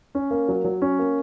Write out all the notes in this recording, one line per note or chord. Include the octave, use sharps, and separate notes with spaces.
C#4
A#3
F#3
F#3
C#4
A#3